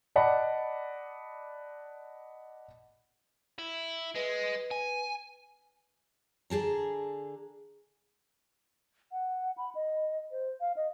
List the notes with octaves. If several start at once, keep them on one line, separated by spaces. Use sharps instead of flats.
D5 D#5 F#5 A5 B5 D6
E4
G#3 B4
G#5
D3 G#4 A5 A#5
F#5
B5
D#5
C5
F5
D#5